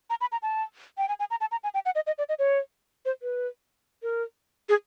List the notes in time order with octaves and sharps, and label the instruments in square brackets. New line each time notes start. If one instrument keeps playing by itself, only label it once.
[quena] A#5
B5
A#5
A5
G5
G#5
G#5
A#5
A5
A#5
G#5
G5
F#5
D#5
D#5
D5
D#5
C#5
C5
B4
A#4
G#4